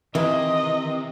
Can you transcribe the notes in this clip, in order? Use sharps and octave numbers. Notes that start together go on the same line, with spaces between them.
C3 D#3 E3 D#5